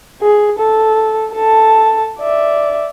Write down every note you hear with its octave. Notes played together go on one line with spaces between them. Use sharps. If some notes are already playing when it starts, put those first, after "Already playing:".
G#4
A4
A4 A5
D5 E5